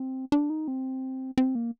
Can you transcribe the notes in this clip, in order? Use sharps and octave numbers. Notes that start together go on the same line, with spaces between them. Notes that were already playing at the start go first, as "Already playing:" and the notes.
Already playing: C4
D4
D#4
C4
C4
A#3